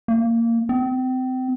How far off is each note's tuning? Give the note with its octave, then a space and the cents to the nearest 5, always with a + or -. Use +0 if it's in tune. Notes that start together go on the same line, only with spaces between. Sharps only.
A#3 -15
C4 -30